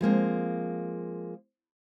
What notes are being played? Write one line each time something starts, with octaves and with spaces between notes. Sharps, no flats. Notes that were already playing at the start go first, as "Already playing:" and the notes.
F3 G#3 A#3 C4